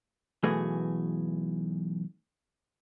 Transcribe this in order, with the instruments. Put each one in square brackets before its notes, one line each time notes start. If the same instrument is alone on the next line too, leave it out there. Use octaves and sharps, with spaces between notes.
[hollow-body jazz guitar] B1 E3 A3 F#4 G#4